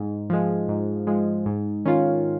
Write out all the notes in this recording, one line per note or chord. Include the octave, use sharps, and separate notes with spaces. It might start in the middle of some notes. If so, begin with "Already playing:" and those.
Already playing: G#2
F3 G#3
G#2
F3 G#3
G#2
D#3 C#4 F4